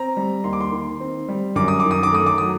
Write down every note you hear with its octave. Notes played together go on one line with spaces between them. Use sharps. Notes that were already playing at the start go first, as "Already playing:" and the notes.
Already playing: C4 A#5
G3
D#2 C6
D6
C6
D#3
C4
G3
F#2 D6
D#6
D6
D#3
D#6
D6
A3 D#6
D6
F#3 D#6